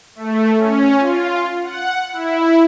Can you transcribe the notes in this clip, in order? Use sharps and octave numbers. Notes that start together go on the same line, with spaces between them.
A3
C#4
F4
F#5
E4